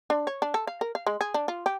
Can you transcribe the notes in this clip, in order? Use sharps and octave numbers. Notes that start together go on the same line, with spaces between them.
D4
C#5
D4
A4
F5
A#4
F5
G#3
G#4
D4
F4
G4